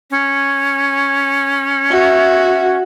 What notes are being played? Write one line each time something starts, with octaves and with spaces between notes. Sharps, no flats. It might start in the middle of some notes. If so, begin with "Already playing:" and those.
C#4
F#4 E5